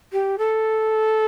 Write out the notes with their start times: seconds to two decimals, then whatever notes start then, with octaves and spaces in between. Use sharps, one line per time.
0.12 G4
0.38 A4